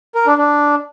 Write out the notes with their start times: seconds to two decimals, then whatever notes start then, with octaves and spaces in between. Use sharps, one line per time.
0.15 A#4
0.27 D4
0.38 D4